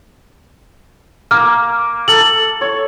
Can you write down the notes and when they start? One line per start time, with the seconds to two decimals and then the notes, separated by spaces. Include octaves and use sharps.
1.31 A#3 F6
2.08 A4 F#7
2.61 C#5